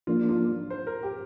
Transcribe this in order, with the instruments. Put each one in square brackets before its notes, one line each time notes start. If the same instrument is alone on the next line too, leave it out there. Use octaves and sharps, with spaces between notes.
[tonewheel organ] F3 A#3 D4 [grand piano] F4
[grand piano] F4
C5
A#4
G4